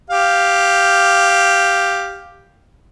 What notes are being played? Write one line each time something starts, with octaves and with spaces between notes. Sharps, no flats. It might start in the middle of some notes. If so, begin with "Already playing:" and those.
G4 F5